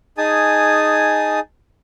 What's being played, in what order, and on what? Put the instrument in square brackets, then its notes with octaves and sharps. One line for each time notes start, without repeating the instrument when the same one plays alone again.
[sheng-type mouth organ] D#4 G#4 G#5 A5 D#6